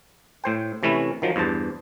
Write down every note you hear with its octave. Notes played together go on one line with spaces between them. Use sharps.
A2 C5 G5
C3 E3 A3 C#4 E4
D#3 F3 F#3
E2 G2 C5 A5